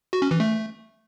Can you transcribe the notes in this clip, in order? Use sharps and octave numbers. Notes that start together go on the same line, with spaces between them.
F#4
C#4
E3
A3